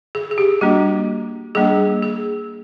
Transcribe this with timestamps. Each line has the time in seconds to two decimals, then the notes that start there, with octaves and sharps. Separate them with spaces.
0.15 G#4
0.31 G#4
0.38 G4
0.61 G3 A#3 D4 F#4
1.55 G3 A#3 D4 G#4
2.02 G#4